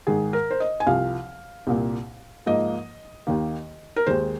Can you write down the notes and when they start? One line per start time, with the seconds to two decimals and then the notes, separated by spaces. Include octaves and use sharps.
0.07 G#2 D#3 G#3 G#4
0.33 A#4
0.51 C5
0.60 D#5
0.80 G#5
0.87 C2 C3 F3 F5
1.67 C2 A#2 A#3
2.46 G#2 F3 A#3 D#5
3.27 D#2 D#3 A#3
3.96 A#4
4.06 D#2 D#3 G#3 C5